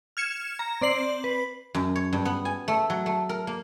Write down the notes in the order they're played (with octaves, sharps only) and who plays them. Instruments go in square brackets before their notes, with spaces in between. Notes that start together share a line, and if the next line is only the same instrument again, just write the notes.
[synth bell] F6 G#6 C#7 E7
A#5
C4 D5 C7 F#7
B4
[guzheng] F#2
C#5
G2
B3
G#5
A3
F#3
A3
A#4
A#3